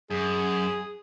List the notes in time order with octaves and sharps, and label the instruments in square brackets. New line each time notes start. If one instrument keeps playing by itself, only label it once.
[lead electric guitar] F#2 [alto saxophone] G#4